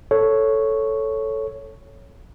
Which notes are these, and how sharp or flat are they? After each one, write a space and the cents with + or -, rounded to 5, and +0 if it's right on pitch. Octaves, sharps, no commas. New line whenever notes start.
A4 +0 C#5 +0